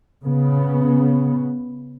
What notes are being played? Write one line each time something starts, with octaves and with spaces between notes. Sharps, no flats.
C#3 B3